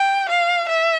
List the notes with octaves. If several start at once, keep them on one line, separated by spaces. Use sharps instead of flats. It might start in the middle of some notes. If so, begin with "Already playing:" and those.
Already playing: G5
F5
E5